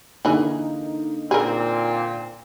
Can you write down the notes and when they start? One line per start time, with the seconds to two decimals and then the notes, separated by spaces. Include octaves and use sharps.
0.25 D3 E3 A#3 D#4 G#4
1.31 A#2 C4 G#4 A#4